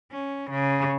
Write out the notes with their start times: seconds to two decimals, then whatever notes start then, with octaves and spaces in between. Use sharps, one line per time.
0.12 C#4
0.50 C#3